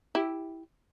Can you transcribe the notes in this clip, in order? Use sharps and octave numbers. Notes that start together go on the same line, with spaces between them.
E4 G4